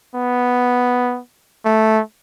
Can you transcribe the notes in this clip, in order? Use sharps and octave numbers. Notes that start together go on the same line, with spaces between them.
B3
A3